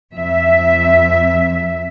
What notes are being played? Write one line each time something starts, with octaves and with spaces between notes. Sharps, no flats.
F2 E5